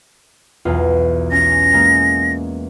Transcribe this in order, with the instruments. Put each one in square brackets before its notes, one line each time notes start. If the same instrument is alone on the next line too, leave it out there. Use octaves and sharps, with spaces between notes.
[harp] B1 E2 F4
[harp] C#4 [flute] A#6
[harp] G#3 A#3